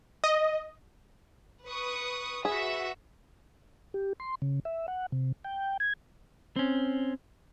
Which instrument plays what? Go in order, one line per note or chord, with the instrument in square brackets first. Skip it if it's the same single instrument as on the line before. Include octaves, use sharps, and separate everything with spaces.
[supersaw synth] D#5
[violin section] B4 C#6 D#6
[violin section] F#4 B4 E5 [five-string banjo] G#4
[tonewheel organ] G4
C6
C#3
E5
F#5
C3
G5
G#6
[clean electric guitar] C4 C#4